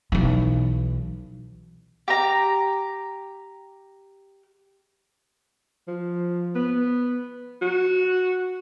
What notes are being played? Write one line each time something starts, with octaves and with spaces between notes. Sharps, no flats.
B1 E3
G4 A#5
F3
B3
F#4